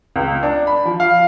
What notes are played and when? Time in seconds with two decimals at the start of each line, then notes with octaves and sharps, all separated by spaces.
0.16 C#2
0.43 D4
0.67 B5
0.85 F3
1.00 F5